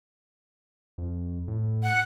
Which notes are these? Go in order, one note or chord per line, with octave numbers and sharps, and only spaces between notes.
F2
A2
F#5